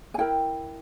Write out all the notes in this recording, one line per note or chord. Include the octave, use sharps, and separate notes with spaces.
G#5
E4 A#4 G5